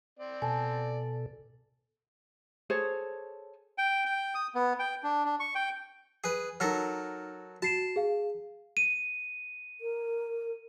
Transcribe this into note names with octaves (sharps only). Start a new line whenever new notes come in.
C4 D5
B2 A4 G#5 A5
G#4 A4 C5 C#5
G5
G5
D#6
B3
G5
D4
D4
C#6
G5
G#4 B4
F#3 D#4 A4 A#4 F6
F#4 A5 C7 E7
G#4 F5
D#7
A#4